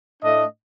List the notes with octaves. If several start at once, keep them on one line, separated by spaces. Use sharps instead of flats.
A2 A3 D4 D#5